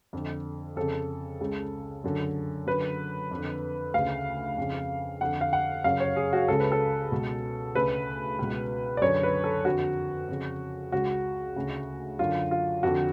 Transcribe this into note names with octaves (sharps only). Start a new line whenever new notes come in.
F2 D3
F2 C#3 A4
C#2 C#3
F#2 D3
F#2 D3 B4
F2 D3
D2 C#3 F5
F2 C#3
F2 D3 F#5
F5
F#5
F#2 C#3 F5
C#5
G#4
F#4
C#2 C#3 A4
B4
A4
C#2 B2
D2 C#3 B4
C#2 B2
D5
F#2 D3 C#5
B4
A4
F2 D3 F#4
F2 C#3
C#2 C#3 F#4
D2 C#3
F#2 D3 F4
F4
F2 D3 F#4